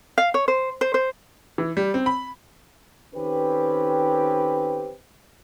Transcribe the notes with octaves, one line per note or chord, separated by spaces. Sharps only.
F5
C#5
C5
C5
C5
E3
G3
C4
B5
D#3 C4 C#4 G4 A4 B4